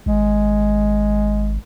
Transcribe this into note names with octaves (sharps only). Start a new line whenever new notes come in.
G#1 G#3